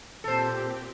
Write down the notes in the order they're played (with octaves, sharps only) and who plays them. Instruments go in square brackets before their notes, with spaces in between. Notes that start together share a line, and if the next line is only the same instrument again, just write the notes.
[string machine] A#2 C4 G4 [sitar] A4 C5